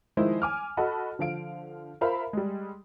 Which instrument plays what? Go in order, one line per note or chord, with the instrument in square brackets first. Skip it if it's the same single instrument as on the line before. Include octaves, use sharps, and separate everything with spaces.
[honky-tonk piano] D#3 F3 G#3 E4 C5
G#5 D6 F6
F#4 A4 D#5 F#5 A5 B5
D3 F3 F5 D7
F4 A#4 C5 E5 F5 B5
G3 G#3